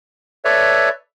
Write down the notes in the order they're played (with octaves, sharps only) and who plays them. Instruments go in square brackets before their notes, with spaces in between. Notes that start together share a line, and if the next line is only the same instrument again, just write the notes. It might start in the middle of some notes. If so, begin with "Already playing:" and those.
[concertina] A4 B4 C#5 D5 E5